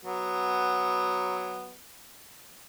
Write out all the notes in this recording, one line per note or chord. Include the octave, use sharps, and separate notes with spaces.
F#3 B3